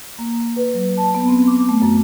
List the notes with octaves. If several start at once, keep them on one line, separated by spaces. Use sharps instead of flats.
A#3
B4
F#3
A5
B3
C4
D6
A3
F#2